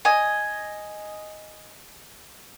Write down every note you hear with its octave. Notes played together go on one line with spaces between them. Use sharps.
D#5 G#5